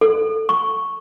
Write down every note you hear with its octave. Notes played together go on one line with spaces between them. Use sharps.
A4
C#6